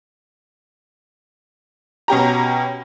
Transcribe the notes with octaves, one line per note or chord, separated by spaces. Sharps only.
B2 C#4 G4 A#5